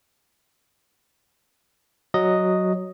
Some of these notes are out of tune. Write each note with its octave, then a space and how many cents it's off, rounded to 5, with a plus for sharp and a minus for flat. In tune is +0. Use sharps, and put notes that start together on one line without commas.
F#3 +0 D#5 +0